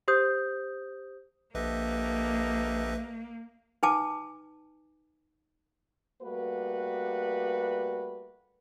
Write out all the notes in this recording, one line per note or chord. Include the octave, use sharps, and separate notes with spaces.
G4 C5 D#6 G6
A#1 A#3 G4 A4 B4 D#5 E5
D#4 B4 G#5 A5 D6
G3 A3 A#3 F#4 B4